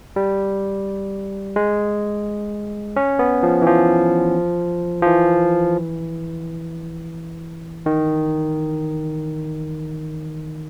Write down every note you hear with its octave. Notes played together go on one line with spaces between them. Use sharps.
G3
G#3
C#4
B3
F3
E3
F3
F3
E3
D#3